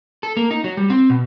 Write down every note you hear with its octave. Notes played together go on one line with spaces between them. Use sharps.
A4
A#3
D#4
F#3
G3
C4
B2